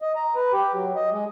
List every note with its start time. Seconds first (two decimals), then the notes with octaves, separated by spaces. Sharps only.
0.02 D#5
0.16 A#5
0.35 B4
0.53 G4
0.74 F#3
0.96 D#5
1.12 G#3